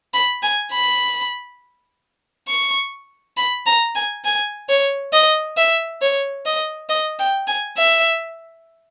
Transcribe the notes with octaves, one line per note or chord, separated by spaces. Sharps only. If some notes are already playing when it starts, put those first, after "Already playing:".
B5
G#5
B5
C#6
B5
A#5
G#5
G#5
C#5
D#5
E5
C#5
D#5
D#5
G5
G#5
E5